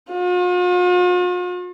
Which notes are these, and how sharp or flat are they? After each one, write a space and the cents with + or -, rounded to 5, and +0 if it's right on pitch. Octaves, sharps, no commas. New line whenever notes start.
F4 +45